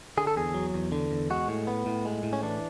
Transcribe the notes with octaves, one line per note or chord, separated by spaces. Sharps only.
D3 G#4
A4
E2 G#4
F#3
E2
D3
E2
G#3 F#4
A2
B3
A2
G#3
A2
C#4
E3 D4